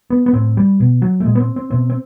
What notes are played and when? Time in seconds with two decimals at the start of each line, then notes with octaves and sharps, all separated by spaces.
0.10 B3
0.26 B3
0.33 A2 C4
0.57 G3
0.80 B2
1.02 F#3
1.20 A3
1.25 A#2 G#3
1.35 B3
1.40 C4
1.56 C4
1.70 B2 C4
1.90 C4